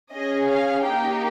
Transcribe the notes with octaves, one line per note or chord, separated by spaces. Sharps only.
C#4 G#4 D#5
F5
A#3 D#4 G4 G5